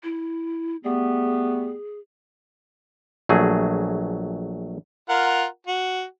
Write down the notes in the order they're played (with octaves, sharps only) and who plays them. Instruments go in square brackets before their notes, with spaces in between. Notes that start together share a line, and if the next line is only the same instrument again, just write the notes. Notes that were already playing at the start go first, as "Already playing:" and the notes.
[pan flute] E4
[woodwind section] G3 A3 B3 [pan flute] G#4
[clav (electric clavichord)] A#1 F#3 A3 G#4
[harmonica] F4 A#4 F#5
F#4